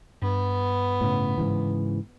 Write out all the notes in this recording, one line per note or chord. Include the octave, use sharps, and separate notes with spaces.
G2 B3
A2 C#3
G#2 C#3 E3